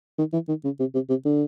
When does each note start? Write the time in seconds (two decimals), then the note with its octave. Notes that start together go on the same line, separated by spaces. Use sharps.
0.18 D#3
0.33 E3
0.48 D#3
0.64 C#3
0.79 C3
0.94 C3
1.09 C3
1.25 D3